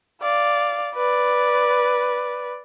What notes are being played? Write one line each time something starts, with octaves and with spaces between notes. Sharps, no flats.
D5 F5
B4 D5